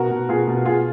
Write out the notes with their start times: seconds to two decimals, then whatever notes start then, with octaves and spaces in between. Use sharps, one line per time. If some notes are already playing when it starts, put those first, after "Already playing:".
Already playing: B2 F#4 A#4
0.11 B2
0.29 B2 F4 G#4
0.47 B2
0.65 B2 F4 G#4